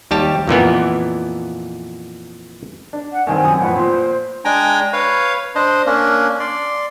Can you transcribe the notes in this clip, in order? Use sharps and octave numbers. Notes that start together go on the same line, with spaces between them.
D#2 G3 G4 A5
F2 A#2 E3 B3
D4
F#5
G2 D#3 C4 G#5
F#2 D#6
F2 A2 F4 B4 F#5
A#2 C5
G#3 D4 G5 G#5 A#5
B4 C#5 F5
D4 C5 D#5
A#3 C#4 D4
D5 C6